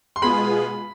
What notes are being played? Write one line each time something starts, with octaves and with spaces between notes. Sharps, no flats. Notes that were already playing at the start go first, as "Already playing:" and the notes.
C6
B2 G#3 B3 F4 G#4 B5